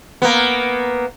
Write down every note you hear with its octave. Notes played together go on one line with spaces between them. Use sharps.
A#3 B3